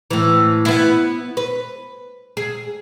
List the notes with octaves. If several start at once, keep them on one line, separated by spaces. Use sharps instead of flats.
A2 E3
B3 E4
B4
G#4